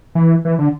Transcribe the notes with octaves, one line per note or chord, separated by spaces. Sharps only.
E3
E3
D3